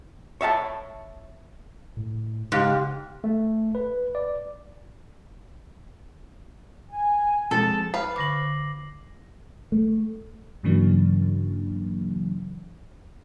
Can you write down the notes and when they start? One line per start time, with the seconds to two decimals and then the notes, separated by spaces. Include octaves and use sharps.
0.41 C#5 E5 F5 A5
1.97 A2
2.52 G#2 C#3 G4 F5
3.24 A3
3.75 B4
4.15 D5
6.91 G#5
7.51 F2 G#3 A4 A5
7.94 B4 F5 C7
8.16 D3 B5 D6 A#6 F#7
9.72 A3
10.63 G2 C#3 E3 F#3 A#3 D4